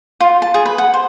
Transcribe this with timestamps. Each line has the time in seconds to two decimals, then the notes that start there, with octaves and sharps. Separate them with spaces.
0.20 F4
0.42 A5
0.54 G#4
0.66 B4
0.78 F#5
0.94 C5